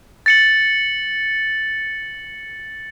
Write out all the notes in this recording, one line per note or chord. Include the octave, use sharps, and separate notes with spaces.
A6 C#7 F#7